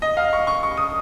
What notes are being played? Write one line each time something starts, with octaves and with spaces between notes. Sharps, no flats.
D#5
F5
C#6
C#6
C#6
D#6